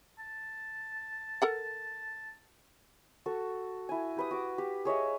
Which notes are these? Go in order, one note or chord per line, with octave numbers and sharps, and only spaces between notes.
A5
A4 A#4 F#5
F#4 A4 C#6
E4 G#5
G4 B4 D#6
F#4 D6
G4
G#4 C#5 D#5 E5